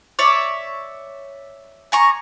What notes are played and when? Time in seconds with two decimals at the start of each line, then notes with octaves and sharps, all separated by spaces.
0.19 C#5 D5 E5
1.92 G#5 A#5 C#6